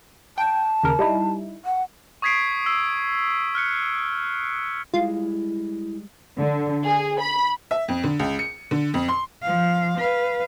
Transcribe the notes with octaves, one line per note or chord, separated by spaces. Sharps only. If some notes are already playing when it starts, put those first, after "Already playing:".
G5 A5
D#2 C#3 A#4
G3 D#4 E4
F#5
C#6 D#6 G#6 B6 C7 D7
E6 C7
F6 F#6 C#7
G3 G#3 E4 F4
D3
G#4
B5
E5
F2
D3
C#2
C#7
D3
F2
C6
F3 F5
B4 F5